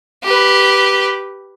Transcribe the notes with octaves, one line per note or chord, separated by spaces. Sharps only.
G4 B4